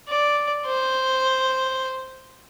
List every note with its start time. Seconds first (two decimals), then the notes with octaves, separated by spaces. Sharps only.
0.08 D5
0.66 C5